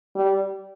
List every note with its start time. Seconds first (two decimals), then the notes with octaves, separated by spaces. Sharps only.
0.16 G3